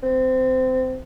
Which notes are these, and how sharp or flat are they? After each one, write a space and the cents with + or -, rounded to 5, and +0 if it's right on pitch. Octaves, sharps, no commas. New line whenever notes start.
C4 -20